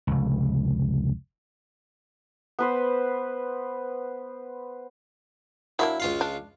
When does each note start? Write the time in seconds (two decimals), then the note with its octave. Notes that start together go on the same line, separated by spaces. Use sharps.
0.07 F1 C#2
2.59 B3 B4 C5
5.79 F#3 A#3 D4 E4
6.00 C#2 F4 F5
6.21 D4